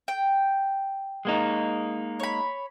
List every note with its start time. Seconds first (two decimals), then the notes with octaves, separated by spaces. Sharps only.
0.08 G5
1.25 G#3 A#3 D#4
2.20 C#5 B5